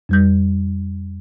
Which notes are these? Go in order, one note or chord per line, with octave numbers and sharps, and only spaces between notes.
F2 G3 G6